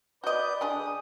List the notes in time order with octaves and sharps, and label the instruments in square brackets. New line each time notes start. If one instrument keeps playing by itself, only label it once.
[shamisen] F#4 D#5 [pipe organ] B4 D5 G6
[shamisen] D3 D4 G#4 [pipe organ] D#6